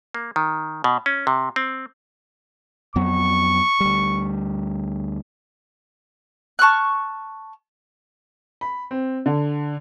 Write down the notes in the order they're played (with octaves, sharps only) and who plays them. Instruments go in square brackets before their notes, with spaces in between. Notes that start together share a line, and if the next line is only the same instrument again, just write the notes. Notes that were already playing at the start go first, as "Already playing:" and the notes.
[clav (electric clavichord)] A#3
D#3
B2
C#4
C3
C4
[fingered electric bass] F2 F#3 B3 [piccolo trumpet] C#6
[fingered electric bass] D2 G3
[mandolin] A5 C#6 F6 F#6
[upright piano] B5
C4
D3